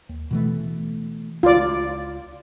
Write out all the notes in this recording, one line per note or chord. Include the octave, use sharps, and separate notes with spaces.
D#2
B2 E3 A3
C#2 F4 D5